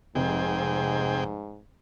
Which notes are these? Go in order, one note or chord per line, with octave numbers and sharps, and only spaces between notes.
F1 G#2 C3 G#4 G5